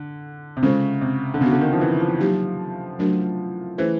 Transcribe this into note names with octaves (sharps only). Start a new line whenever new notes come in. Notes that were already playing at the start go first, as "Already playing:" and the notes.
Already playing: D3
C3
C#3 G#3 C#4 F4 A4 C5
C3
D3
C#3 B3 D4 F#4
D3
D#3
F3
E3
F3
F#3 A#3 D#4 G4
F#3 A3 D4 F#4 A#4
E3 A3 C#4 F4 G#4 C5